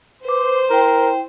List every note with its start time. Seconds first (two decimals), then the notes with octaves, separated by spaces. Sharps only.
0.25 B4 C5 D6
0.70 E4 A#4 G5